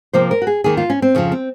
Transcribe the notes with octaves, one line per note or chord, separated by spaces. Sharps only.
C3 F3 A#3 C5
A#4
F#4
G#4
D#2 D#3 A#3 G#4
F4
C#4
C4
F2 C#3 F3
C4